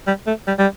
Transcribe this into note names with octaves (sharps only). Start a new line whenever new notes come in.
G3
A3
G3
G3